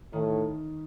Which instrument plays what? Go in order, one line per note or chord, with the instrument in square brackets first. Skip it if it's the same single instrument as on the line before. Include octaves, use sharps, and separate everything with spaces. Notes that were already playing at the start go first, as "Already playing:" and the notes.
[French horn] A2 [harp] D#3